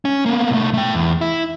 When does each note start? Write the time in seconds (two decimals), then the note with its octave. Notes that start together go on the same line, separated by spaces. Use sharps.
0.05 C#4
0.26 A#3 B3
0.50 C2 A3
0.74 A3 G5
0.95 E2
1.21 E4